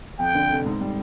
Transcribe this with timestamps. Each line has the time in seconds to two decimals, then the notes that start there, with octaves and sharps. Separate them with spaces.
0.19 F2 G5
0.35 D3
0.50 F1
0.66 G#2
0.81 G3